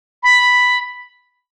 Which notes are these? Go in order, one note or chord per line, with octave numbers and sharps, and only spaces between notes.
B5